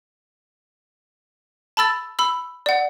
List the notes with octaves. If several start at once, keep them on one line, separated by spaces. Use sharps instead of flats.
A5 B5 E6 A6
B5 E6
D5 F#5